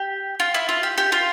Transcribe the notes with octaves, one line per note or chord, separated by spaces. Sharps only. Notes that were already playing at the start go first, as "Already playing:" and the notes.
Already playing: G4
F4
E4
F4
G4
G4
F4